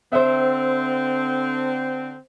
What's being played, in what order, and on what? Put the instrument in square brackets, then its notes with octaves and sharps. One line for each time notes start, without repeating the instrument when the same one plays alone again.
[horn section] D3 C4 [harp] C5 E5